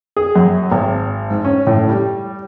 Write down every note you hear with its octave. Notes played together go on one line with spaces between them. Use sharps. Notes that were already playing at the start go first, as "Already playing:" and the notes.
G#4
F#2
G#1
G#2
C#4
A2
G3